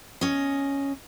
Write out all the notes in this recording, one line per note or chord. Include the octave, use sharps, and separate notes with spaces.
C#4 D#5